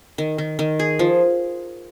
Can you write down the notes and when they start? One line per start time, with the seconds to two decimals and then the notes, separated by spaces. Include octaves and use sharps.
0.18 D#3
0.38 D#3
0.59 D#3
0.80 G#4
0.99 F3